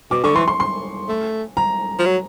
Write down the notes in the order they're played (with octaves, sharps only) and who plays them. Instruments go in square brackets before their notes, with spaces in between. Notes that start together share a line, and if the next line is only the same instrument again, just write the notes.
[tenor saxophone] B2 [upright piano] D6
[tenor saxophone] D3 [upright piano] C#6
[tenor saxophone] E3 [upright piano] C6
[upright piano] C6
C6
[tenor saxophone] A3
[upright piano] A#5
[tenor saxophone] F3
F#3